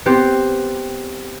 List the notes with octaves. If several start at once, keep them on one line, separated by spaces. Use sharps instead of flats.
B3 C4 G4 C5